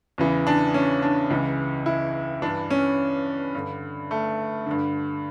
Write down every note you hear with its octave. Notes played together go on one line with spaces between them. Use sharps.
E2 C#3 E3
D4
C#4
D4
C#2 C#3 E3
E4
G2 E3 D4
C#4
G2 D3
A3
G2 D3